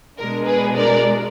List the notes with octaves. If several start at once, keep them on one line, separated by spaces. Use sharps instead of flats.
B2 G#3 D4 A#4
G#4 B4
A#4 D5